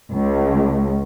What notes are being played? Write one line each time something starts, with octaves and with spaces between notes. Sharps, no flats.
C#2